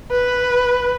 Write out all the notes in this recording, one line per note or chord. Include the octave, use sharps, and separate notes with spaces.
B4